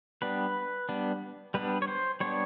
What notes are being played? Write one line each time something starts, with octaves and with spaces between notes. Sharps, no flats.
G3 B3 D4 B4
G3 B3 D4
G3 B3 D4 B4
C#5
C5
G3 B3 D4 C#5